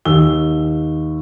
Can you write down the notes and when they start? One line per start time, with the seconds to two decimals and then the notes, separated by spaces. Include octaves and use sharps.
0.05 D#2 E6 G7